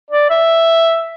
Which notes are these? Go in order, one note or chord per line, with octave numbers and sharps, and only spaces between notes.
D5
E5